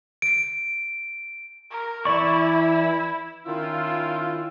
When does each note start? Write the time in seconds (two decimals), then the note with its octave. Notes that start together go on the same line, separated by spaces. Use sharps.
0.22 D7
1.70 A#4
2.05 E3 E4 D5 C#6
3.46 D#3 C#4 E4 F4